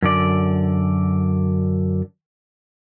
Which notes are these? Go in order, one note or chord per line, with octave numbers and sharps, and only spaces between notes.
F#2 D3 D5